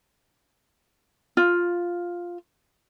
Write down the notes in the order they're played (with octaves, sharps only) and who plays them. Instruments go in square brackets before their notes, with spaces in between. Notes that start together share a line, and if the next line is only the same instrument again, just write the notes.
[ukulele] F4